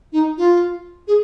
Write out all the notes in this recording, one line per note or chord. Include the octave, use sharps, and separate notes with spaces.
D#4
F4
G#4